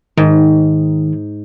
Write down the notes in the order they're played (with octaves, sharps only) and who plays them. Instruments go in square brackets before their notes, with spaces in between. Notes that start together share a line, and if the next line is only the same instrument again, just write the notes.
[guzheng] G#2 [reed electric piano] D#3